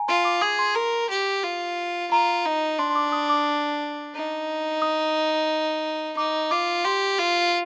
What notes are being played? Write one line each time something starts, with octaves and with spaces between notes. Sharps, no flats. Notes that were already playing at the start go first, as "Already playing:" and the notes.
Already playing: G#5 A#5
F4 C6
D6
G#4 D#6
C6
A#4
G4
F4
F4 A#5
D#4
D4 C6
C6
D6
D#6
D6
D#4
D#6
D#4 D6
F4 D6
G4 C6
F4